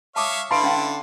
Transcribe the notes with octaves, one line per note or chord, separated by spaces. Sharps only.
C#5 E5 F5 A5 D6 D#6
D3 E4 B4 F5 A5 B5 C6 D7
C#4 F5